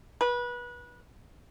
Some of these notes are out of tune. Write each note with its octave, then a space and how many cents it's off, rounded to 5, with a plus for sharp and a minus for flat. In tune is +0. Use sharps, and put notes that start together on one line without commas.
B4 -25